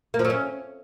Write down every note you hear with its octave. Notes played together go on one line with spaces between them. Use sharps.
A#3
F3
F#3
C#4